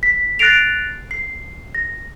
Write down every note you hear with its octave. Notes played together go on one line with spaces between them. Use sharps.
B6
F#6 A6 A#6 C7 D7 F7
C7
A#6